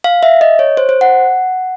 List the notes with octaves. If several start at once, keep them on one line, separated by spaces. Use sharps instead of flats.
F5
E5
D#5
C#5
C5
C5
F#5